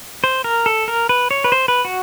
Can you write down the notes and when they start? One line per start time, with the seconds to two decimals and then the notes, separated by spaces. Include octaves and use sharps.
0.24 C5
0.44 A#4
0.66 A4
0.88 A#4
1.09 B4
1.31 C#5
1.44 B4
1.52 C5
1.68 B4
1.85 F#4